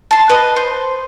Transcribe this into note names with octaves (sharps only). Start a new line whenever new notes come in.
A5 C6
B4 D#5 A5
C5